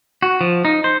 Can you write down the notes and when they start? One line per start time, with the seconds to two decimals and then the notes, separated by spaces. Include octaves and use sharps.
0.22 F#4
0.41 F3
0.65 D#4
0.84 C5